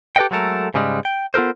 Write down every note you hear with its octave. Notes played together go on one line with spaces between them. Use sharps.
G4 A4 B4 D#5 F#5 G5
F#3 G#3 A3 A4 A#4
G#2 C#3 G3 G#3
G5
B3 F4 A4 A#4 C5